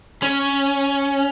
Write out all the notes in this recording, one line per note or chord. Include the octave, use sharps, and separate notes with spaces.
C#4